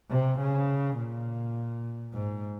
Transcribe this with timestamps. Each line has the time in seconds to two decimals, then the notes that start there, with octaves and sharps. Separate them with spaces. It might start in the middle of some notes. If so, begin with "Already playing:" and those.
0.10 C3
0.40 C#3
0.98 A#2
2.13 G#2